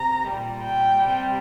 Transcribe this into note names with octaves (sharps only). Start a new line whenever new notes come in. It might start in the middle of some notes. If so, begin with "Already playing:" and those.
Already playing: C3 A#5
A#2 G3
G5
C3 G3